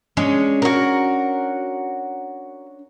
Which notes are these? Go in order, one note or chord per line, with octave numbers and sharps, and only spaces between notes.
G#3 C#4 D4 C#5
F#4 A#4